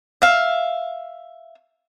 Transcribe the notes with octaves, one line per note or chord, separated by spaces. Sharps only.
E5 F5